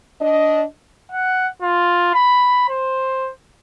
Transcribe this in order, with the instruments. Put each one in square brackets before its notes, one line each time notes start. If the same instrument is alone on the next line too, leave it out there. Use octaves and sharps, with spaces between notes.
[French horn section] D4 D#5
[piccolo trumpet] F#5
F4
B5
C5